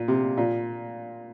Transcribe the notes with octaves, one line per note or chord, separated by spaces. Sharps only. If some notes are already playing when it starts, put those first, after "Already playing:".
Already playing: A#2
C3
A#2